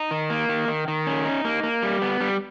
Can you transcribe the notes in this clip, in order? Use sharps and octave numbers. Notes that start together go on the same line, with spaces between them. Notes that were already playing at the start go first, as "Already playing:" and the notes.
Already playing: D#4
D#3
A#3
D#3
D#3
D#3
C#4
D#4
A#3
A#3
G3
B3
G3